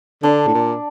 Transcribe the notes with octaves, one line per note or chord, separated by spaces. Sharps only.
D3 D4
A2
A#2